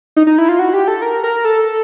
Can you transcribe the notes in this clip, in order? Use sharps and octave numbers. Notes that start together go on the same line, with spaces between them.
D#4
D#4
E4
F4
F#4
G4
A4
A#4
A#4
A4